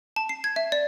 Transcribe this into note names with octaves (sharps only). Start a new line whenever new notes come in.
A5
C7
G#6
E5
D5